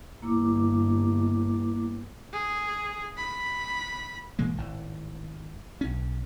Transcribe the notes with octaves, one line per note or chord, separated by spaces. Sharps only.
G1 A#3 E4 D6
G#4
B5
A#2 E3 G#3 A#3
G#1 A2
B1 C#4